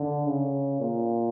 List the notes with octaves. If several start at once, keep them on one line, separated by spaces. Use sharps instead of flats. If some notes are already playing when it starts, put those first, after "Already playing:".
Already playing: D3
C#3
A#2